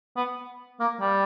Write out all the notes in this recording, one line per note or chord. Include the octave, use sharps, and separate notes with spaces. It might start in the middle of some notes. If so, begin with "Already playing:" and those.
B3
A#3
G3